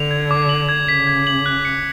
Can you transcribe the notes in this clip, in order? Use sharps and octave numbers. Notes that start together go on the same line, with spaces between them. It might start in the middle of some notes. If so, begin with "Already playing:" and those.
Already playing: D3 F7
G#6
D6
F#7
G#6
C#3 B6
G#6
F#7
F#6
C#7